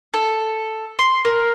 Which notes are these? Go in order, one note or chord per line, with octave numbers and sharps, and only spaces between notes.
A4
C6
A#4